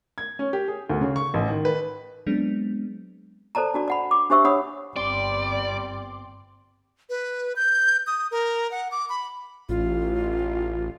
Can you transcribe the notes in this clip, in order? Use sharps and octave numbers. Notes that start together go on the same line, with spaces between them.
G#6
C#4
G4
G#4
D2
C#3
C#6
A1
D#3
B4
F#3 G#3 B3 C4 D4
A4 C5 D5 A5 A#5
D4 F#4 D5
D5 F#5 B5
D6
D4 G4 C5 E5 C#6 E6
D4 C#5 F#5 B5 D#6
G1 G3 C4 D5 C6 D6
B4
G6
D#6
A#4
F#5
D6
B5
A1 F4